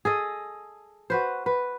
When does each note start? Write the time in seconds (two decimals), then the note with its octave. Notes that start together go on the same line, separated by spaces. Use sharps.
0.05 G#4 A4 D#5
1.10 F#4 B4 C5
1.46 B4